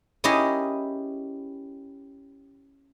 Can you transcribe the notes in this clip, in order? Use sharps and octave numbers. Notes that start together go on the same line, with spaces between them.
C#4 E4 G4 G#4 A#4 D#5